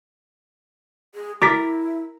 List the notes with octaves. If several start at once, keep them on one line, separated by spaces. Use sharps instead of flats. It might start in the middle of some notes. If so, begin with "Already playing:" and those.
G#4
E4 A#4 D6 A6 B6